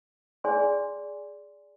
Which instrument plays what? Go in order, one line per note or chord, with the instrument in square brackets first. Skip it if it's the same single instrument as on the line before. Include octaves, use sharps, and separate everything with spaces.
[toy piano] G#4 D5 G#5 C6